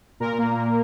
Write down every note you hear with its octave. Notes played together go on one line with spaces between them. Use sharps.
A#2 A#4
A#3
A#2